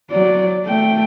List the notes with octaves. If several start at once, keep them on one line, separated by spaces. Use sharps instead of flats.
F#3 D5
A3 G5